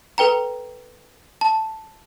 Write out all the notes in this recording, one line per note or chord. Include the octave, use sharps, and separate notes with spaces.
A4 B4 G5 A#5
A5